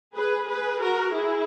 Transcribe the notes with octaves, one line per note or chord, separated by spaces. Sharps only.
G#4 B4
G#4 B4
F#4 A#4
E4 G#4